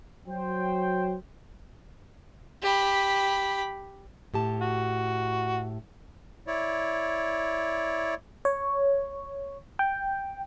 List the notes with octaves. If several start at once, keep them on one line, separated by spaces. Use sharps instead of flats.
F#3 C5 G5
G4 B5
A2 G4 A5
F#4
E4 C#5 D5
C#5
G5